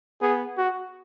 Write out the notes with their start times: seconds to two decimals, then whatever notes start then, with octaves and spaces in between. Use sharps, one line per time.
0.22 B3 G#4
0.58 F#4